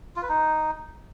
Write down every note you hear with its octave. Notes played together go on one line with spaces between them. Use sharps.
F4
B4
D#4